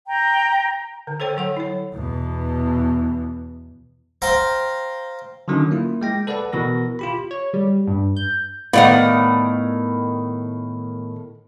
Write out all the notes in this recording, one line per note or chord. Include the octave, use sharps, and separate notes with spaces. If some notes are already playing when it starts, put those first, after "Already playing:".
G5 A#5
D3
A4 C5 C#5 G5
F#3 A4 F#5
E4 C#5
E2 B2
C5 F5 G5 A#5 C6
D3 D#3 F#3 C#4 D#4
A#3 E4 F4
G#3 G5 A#6
A4 B4 D5 F#5 A5
B2 E3 A#4 A#6
F4 G4 B5
C#5
G3
G2
G6
A2 D3 D#3 B3 D5 F5 F#5